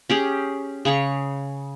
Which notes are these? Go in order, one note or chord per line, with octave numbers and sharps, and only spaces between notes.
C#4 G4 G#4
C#3 G#4 C#5 C#6